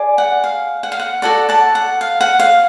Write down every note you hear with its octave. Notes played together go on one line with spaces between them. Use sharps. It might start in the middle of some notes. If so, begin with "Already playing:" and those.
Already playing: G#4 D5
F#5
F5
F#5
F5
F#5
F#4 A4 D5 F#5
F#5 A5
F#5
F5
F#5
F5